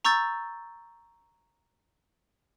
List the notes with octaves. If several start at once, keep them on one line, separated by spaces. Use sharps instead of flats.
A#5 C#6 E6 G6 A6